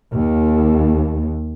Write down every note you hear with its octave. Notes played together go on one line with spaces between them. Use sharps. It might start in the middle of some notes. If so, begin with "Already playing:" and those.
D#2